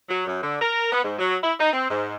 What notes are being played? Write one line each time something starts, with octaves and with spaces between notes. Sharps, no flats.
F#3
F#2
D3
A#4
B3
G#2
F#3
E4
D#4
C4
G#2